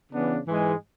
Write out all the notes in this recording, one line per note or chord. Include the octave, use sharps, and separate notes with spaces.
C#3 E3 B3 D4
G#2 E3 G#3